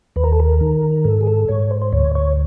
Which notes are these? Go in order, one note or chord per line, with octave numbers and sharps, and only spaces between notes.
D#2 B4
A#4
A4
A#4
D#3
G#2 A4
G#4
A4
G#2 C#5
C5
C5
D2 C#5
C#5